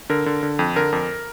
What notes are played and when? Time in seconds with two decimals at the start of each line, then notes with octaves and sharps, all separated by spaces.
0.09 D3 A#4
0.26 D3
0.43 D3
0.59 F2
0.76 D3 A#4
0.93 F2